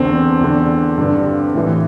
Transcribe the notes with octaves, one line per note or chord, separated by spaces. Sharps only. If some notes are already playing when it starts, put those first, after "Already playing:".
Already playing: E2 D3 C4
E2 D3
G2 D3
A2 E3